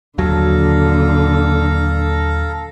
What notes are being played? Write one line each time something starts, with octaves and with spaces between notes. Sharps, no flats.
D#2 A#2 D3 F#3 A4 F5 A#5